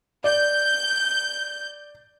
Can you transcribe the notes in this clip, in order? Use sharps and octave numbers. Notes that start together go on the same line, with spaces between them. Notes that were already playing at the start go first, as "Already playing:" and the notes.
D5 G6